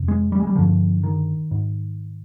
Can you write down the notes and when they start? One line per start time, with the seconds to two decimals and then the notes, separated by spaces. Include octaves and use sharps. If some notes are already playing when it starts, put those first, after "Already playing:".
Already playing: F2 C3
0.08 G#3
0.32 G3
0.40 G#3
0.47 G3
0.56 G2 D3 F3
1.03 D#3
1.51 G#2